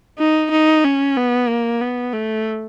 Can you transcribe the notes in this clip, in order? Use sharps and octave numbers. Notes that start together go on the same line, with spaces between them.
D#4
D#4
C#4
B3
A#3
B3
A3